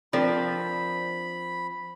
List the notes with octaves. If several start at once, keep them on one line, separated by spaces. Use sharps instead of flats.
F3 C4 D4 A#4 D5 B5